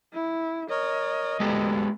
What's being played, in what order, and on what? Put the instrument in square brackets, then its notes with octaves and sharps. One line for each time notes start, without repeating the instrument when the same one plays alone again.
[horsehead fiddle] E4
[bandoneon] A#4 C#5 [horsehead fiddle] D#5
[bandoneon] D2 A4 [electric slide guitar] G#3 B3 G4